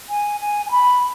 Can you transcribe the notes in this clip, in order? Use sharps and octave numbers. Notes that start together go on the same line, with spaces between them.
G#5
G#5
G#5
B5